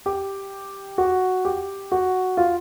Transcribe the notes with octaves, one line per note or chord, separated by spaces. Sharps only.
G4
F#4
G4
F#4
F4